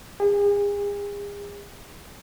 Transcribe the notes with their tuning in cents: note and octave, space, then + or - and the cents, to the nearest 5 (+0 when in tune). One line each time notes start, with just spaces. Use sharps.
G#4 -40